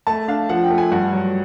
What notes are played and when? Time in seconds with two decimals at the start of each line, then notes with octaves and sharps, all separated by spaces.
0.07 A3 A5
0.28 D4 F5
0.49 F3 F#5
0.63 G5
0.70 A3
0.78 G#5
0.92 G2 F#5
1.13 F#3